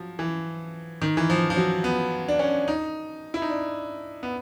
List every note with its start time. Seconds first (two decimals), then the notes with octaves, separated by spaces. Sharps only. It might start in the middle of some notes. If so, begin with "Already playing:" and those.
Already playing: F3 F#3
0.19 E3
1.02 D#3
1.17 E3
1.30 F3
1.50 F3
1.56 F#3
1.84 B3
2.28 D4
2.39 C#4
2.68 D#4
3.34 E4
3.42 D#4
3.50 D4
4.23 B3